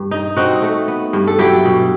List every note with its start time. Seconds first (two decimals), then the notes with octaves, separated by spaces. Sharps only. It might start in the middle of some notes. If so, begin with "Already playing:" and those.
Already playing: G2
0.11 D#4
0.37 C4 D#4 F#4
0.62 A3
0.88 B3
1.13 G2
1.27 A4
1.39 F#3 E4 G4
1.65 B2